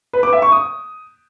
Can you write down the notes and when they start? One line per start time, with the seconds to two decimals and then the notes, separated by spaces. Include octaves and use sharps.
0.13 B4
0.23 D6
0.33 E5
0.42 C#6
0.52 D#6